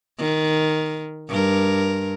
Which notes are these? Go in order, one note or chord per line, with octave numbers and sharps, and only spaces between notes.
D#3
G2 A#4